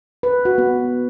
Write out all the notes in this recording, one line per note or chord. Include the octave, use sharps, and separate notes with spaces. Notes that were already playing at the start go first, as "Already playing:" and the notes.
B4
F#4
B3